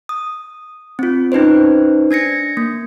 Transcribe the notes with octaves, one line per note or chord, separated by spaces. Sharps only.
D#6
C4 F4
C#4 D#4 B4 C5
D4 G#6 A#6 C#7
A#3